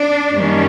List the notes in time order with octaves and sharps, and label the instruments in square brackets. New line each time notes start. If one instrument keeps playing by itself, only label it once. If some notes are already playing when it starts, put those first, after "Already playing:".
Already playing: [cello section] D4
F#2 D#3 G3 A#3 C#4